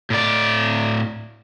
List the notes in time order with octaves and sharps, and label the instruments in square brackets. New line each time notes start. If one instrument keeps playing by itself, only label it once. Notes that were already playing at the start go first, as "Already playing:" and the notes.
[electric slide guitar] A2 D5